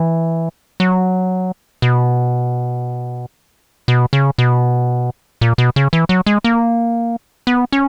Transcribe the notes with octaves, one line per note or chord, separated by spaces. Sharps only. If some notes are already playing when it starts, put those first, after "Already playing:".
Already playing: E3
F#3
B2
B2
C#3
B2
A#2
B2
C#3
E3
F#3
G#3
A#3
B3
C#4